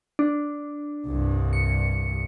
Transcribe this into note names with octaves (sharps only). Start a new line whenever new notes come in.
D4
C2 G2
C#7